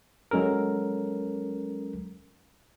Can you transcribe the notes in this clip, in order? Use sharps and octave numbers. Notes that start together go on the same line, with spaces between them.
F#3 G#3 C#4 A4 A#4